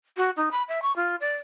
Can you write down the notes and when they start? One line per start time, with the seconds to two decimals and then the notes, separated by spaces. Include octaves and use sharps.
0.17 F#4
0.37 D#4
0.51 B5
0.68 E5
0.82 C#6
0.96 F4
1.20 D5